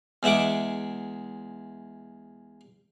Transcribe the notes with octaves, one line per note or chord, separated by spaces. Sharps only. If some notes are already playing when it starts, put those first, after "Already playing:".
E2 G#3 E5 F#5 D6